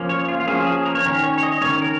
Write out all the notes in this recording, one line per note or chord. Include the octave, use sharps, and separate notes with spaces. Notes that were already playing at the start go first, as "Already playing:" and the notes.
Already playing: F3 A#3 C#4
C#5
F4
F4
F3 A#3 C#4 G#4
G#4
A#4
C#5
D#3 C#4 A#4
C#5
C#5
D#5
D#3 C#4 C#5
A#4